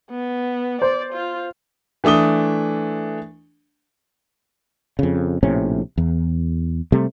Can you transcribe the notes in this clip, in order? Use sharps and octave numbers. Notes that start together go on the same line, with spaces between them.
B3
C5 D5
F4
E3 A3 D4 D#6 G7
F2 C#3
A#1 A2 C3 C#4
E2
C3 G3 A3